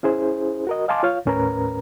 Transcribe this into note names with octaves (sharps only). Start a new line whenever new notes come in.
C#4 E4 G#4 C5
F#4 A#4 D#5
D#5 F5 G#5 A5 C6 D6
F4 C#5 F5
D#2 A2 C#4 A#4 B4 A#5